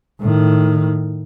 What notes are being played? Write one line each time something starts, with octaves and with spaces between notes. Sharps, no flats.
A2 D#3